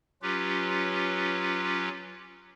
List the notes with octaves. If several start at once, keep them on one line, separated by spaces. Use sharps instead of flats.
F#3 C#4 F4 G4 B4